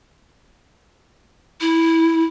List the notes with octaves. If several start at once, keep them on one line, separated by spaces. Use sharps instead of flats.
E4